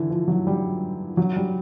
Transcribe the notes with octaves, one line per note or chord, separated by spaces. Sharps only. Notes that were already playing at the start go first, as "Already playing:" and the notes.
Already playing: D3 E3
F3
F#3
G3
F#3
G3